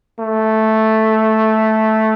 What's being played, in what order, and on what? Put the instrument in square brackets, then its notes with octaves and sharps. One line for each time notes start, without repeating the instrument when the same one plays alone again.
[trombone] A3